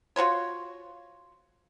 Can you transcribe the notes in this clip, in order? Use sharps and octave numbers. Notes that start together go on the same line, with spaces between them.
F4 F#4 C5 C#5